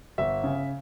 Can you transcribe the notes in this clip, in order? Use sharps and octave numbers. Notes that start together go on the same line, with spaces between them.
G1 E5
C#3